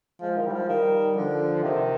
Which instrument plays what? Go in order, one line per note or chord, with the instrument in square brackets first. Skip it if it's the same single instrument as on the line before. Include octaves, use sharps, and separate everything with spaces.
[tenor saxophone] F3 [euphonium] G#3
[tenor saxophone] D#3
G3
F3
[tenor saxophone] D#3 [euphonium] G3
[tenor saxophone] D3 [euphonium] F3
[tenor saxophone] C3 [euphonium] D#3